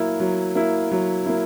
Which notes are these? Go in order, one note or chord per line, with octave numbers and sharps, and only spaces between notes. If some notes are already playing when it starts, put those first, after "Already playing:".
Already playing: F#3 A#3 E4
F#3
A#3 E4
F#3
A#3 E4